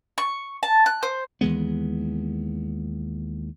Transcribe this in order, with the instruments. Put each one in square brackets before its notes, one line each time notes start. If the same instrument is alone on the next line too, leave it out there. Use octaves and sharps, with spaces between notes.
[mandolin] C#6
A5
F#6
C5
[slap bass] D#2 E3 G#3 B3